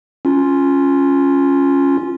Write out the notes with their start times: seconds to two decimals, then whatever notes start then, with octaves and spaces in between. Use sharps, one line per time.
0.25 C#4 F4